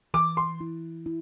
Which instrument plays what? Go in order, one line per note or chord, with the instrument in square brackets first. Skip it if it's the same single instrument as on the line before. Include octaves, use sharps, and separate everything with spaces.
[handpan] E3 [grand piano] D6
[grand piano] C6
[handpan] E4
E4